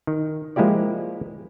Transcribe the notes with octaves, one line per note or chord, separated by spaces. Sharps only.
D#3
F3 G#3 A#3 E4 G4 D5